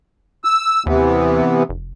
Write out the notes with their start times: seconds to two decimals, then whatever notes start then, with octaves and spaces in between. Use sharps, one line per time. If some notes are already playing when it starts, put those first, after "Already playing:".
0.44 E6
0.86 D#2 C3 E3 B3
1.69 F1